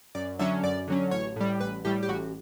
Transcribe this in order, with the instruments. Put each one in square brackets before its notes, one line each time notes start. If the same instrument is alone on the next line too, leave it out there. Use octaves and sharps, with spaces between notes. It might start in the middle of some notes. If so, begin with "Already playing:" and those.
[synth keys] F#2 D5
D3 F#3 C#4 E5
F#2 D5
D3 F#3 C#4
A1 C#5
A2 G3
A1 B4
A2 G3 G4
G4
A1 F#4